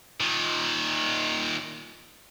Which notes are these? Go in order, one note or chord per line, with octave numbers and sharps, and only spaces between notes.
A#2 D#3